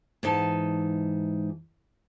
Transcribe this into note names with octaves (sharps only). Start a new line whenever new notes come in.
G#2 E3 D#4 A5